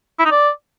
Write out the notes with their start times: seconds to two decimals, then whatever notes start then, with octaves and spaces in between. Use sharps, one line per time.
0.19 E4
0.25 D#4
0.32 D5